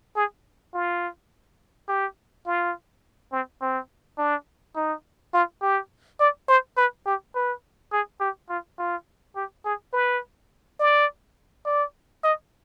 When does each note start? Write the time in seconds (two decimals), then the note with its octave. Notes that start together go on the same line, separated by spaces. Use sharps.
0.16 G#4
0.74 F4
1.89 G4
2.47 F4
3.33 C4
3.62 C4
4.18 D4
4.76 D#4
5.34 F4
5.62 G4
6.20 D5
6.49 C5
6.77 B4
7.06 G4
7.35 B4
7.92 G#4
8.21 G4
8.49 F4
8.79 F4
9.36 G4
9.65 G#4
9.93 B4
10.80 D5
11.66 D5
12.24 D#5